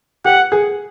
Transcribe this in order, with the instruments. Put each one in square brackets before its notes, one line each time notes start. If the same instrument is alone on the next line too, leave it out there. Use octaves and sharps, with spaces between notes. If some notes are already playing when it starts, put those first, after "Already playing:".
[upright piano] G4 [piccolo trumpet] F#5
[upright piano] G#4